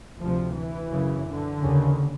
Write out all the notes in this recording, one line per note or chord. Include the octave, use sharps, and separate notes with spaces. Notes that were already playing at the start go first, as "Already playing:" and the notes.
D2 C3 F3
E3
F#2 C#3
D3
D#2 C#3